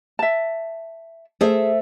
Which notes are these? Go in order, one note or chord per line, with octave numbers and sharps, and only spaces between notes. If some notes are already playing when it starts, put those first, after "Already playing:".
E5 A5
A3 G#4 C5 E5